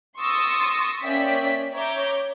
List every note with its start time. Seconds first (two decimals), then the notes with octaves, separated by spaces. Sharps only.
0.18 C6 C#6 D#6 E6 A6 A#6
1.03 A#3 C#4 D5 E5 G5 B6
1.74 C#5 E5 A#5 D6 G6